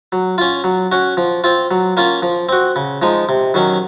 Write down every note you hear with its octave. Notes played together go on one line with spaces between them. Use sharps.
F#3
C#4 F4
F#3
C#4 F#4
F3
C4 F4
F#3
A#3 C#4 F4
F3
C4 F#4
C#3
F3 G#3 D#4
C3
D#3 F#3 C#4